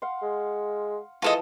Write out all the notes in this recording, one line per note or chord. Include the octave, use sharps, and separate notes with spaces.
F5 F#5 C6
G#3
E3 F3 F4 A4 D#5